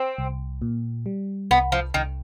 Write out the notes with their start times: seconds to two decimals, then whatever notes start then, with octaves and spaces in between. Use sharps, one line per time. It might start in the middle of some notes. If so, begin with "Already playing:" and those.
Already playing: C4
0.18 C2
0.62 A#2
1.06 G3
1.51 C2 B3
1.72 F3
1.94 C2 D#3